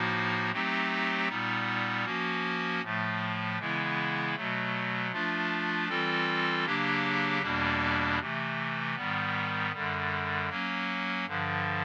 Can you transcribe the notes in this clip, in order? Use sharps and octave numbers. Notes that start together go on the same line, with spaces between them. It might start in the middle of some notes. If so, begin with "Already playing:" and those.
Already playing: A2 F3 A#3 D#4 F#4
F#3 A3 C4 D#4 G4
A#2 G3 B3 D#4
F3 A#3 C#4 F#4
A2 F3 A3
C#3 E3 G#3 B3 E4
B2 F#3 A3
F3 A3 D4 F4
E3 G3 C4 F4 A4
C#3 F#3 A#3 D4 G4
E2 B2 G3 A#3 D4
C3 E3 A3
G#2 D#3 G3 B3
F#2 D3 G3
F#3 A#3 C#4
G2 D3 F3